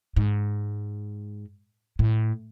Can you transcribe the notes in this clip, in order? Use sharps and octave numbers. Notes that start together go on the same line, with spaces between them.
G#2
A2